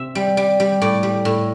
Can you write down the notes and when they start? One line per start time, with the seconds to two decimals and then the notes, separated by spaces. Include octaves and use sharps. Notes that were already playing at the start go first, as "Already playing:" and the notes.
Already playing: C3 E5
0.15 G3
0.37 G3
0.60 G3
0.82 A2 D5
1.03 G3
1.25 A2